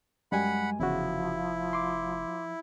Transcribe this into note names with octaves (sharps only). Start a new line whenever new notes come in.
F#2 G3 G#3 F#5 G#5 B5
F1 E2 C#3 F3 E4 F#4
C6 D6